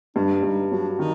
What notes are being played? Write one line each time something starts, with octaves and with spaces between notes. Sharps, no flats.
G2 D4
G2 D#4
F#3 D4
D#3 D#4